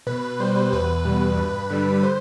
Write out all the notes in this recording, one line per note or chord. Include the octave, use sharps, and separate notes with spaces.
B2 B4
B4
G3 C5
B4
E2 B4
B2 G3
G2
D3 G3
C5